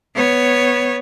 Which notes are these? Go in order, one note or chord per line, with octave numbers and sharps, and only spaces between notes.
B3 C#5